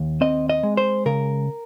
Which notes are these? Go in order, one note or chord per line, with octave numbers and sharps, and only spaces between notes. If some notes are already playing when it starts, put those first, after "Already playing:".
Already playing: D#2
C4 D#5
D#5
G#3
C5
C#3 A#4